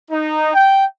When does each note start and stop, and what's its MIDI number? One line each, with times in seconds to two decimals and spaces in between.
0.10 0.53 63
0.53 0.84 79